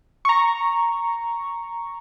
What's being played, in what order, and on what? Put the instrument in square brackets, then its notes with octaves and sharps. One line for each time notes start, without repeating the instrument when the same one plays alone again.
[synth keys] A#5 C#6